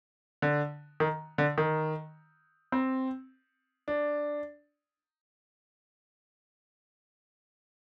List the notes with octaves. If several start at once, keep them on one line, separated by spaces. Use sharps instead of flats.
D3
D#3
D3
D#3
C4
D4